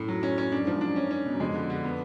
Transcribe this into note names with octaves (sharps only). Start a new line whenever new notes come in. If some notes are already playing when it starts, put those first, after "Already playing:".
Already playing: F#2 A2
F#3
C#4
C#4
F#2 D4
G#2 F3
F#2 D4
C#4
C#4
B2
F#2
F2 G#3
D3
D3
B3